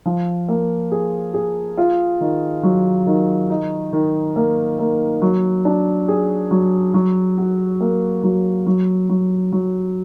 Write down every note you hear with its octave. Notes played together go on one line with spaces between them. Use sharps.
F3
A#3
G#4
G#4
F4
D#3
F#3
D#3
D#4
D#3
A#3
A#3
F#3
D4
G#4
F#3
F#3
F#4
A#3
F#3
F#3
F#3
F#3